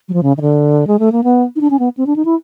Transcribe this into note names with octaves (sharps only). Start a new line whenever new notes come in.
F#3
F3
C#3
D#3
D3
G#3
A3
A#3
B3
D#4
D4
C#4
B3
C4
D4
D#4
E4